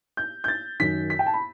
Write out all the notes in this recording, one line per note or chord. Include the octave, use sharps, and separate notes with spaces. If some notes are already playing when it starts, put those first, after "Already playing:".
G6
G6
A6
F#2 D#3 B6
B6
G5
A5
B5